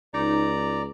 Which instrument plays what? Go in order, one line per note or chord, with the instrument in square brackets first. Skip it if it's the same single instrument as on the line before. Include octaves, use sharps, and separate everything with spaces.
[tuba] C#2 [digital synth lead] D#4 [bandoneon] D5 A#5